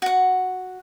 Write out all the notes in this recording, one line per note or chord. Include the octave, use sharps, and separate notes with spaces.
F#4 F#5